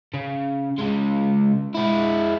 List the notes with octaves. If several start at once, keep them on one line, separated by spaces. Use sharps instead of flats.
C#3
C#3 G#3
G#3 E4